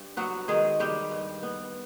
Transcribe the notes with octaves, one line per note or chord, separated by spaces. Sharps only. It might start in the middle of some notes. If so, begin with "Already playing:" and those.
Already playing: G2
F#3 B3 F#4
D#3 G#3 G#4
G3 G#3 G4
G2
B3